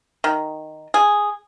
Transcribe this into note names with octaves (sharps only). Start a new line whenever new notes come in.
D#3
G#4